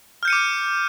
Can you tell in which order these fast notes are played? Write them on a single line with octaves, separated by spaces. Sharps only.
F6 G6 C#7 D#7 D6